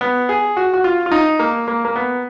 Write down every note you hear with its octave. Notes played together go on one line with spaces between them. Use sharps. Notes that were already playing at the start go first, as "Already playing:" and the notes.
B3
G#4
F#4
F#4
F4
F4
D#4
A#3
A#3
A#3
B3